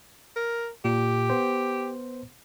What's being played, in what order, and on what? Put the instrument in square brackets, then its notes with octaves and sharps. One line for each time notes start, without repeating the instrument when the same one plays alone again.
[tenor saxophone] A#4
[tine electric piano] A#2 [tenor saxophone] G4
[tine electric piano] B3 C5